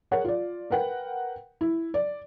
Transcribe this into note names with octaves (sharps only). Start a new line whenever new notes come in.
G#4 A#4 C#5 F#5
F4 D5
A#4 B4 F#5 G5
E4
D5